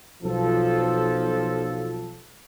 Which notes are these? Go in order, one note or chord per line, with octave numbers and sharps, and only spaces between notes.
B1 F3 A4